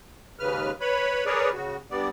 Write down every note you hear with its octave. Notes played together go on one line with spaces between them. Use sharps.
D#2 G#2 C#3 B4 F6
B4 C#5 B5
G#4 A#4 B4 C#5 D5
C#3 F#4
G2 G3 B3 D5